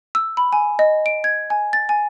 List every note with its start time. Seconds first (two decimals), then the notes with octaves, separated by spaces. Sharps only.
0.15 E6
0.37 B5
0.53 G#5
0.79 D#5
1.06 D7
1.24 G#6
1.50 G#5
1.73 A6
1.89 G#5